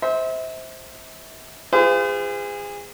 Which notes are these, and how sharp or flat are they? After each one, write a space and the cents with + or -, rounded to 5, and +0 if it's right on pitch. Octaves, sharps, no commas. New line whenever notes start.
C5 +0 E5 -35
F4 -20 G#4 -30 C5 -45